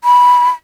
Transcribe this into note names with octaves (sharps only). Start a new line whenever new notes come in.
B5